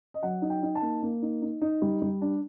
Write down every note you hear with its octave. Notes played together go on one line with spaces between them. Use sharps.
D#5
F#3 F#5
D#4
G5
D#4
A5
A#3
A#3
D#4
D#4
D#4
G3
G3
D4